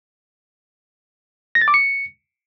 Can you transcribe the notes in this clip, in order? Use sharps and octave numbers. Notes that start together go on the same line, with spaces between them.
A#6
A6
D6
C#7